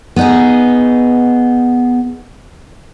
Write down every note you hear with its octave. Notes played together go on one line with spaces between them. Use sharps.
B3 D#4 G#4